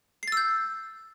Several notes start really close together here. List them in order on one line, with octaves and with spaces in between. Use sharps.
C7 A6 E6 G6